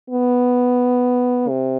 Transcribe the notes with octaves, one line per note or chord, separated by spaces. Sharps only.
B3
C3